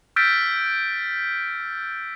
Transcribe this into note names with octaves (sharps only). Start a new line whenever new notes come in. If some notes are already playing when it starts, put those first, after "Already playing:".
E6 F6 G6 A6 B6 D7